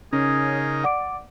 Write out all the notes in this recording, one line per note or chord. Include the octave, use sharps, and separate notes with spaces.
C#3 C#4 D#4 G#4 A#4
D5 F#5 D6 D7